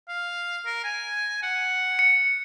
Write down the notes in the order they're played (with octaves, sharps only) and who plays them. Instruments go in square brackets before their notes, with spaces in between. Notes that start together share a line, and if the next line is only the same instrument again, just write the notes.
[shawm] F5
A#4
G#5
F#5
[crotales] C#7